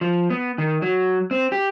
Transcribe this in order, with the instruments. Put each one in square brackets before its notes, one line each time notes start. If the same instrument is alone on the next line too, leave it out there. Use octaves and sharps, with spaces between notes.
[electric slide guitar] F3
B3
D#3
F#3
C4
G4